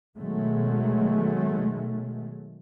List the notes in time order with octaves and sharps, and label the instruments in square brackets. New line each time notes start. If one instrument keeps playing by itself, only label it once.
[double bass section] B2 D#3 F#3 G#3 A3